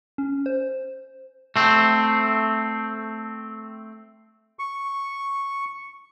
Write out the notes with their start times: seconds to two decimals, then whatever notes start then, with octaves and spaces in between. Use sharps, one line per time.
0.18 C#4
0.46 C5
1.56 A3 C4
4.59 C#6